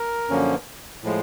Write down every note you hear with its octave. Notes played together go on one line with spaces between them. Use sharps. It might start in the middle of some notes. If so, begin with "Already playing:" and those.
Already playing: A#4
F#2 D3 F3 A#3 C#4
A2 F3 G#3